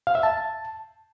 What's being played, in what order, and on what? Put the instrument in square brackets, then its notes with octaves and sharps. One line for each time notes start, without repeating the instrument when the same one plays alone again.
[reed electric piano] F5
E5
A5